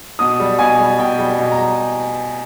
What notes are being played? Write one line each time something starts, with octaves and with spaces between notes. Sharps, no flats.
B2 D#6
G3
B2 G#5
G3
B2 G5
G3
B2
A#5
G3